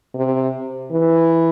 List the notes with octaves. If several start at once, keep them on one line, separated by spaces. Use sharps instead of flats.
C3
E3